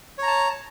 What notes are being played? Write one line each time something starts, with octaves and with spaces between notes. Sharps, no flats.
C#5 A5 A#5